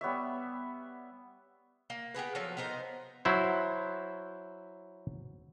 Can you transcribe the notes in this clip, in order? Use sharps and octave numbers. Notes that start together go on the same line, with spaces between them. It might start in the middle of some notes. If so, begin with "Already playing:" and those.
G3 B3 C#5 E5
A#3
B3 G4 G#4 B4
F3 F#3 A4
B3 D#4 A#4 C5
F#3 E4 C5